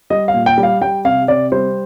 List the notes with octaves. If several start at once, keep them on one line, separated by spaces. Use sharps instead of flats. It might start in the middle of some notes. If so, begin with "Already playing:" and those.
G3 D#5
F5
A#2
G5
G3
F5
G3 G5
C3 F5
C3 D5
G3 C5